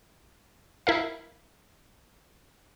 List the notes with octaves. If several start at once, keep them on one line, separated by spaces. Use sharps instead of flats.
E4 A#4 F5